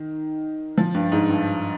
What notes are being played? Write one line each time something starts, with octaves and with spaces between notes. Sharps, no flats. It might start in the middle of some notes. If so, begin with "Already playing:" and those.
Already playing: D#3
F3
G2
G#2
G2